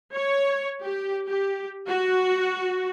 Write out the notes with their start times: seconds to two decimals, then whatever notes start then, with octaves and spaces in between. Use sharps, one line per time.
0.16 C#5
0.83 G4
1.27 G4
1.88 F#4